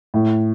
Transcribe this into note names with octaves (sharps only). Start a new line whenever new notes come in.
A2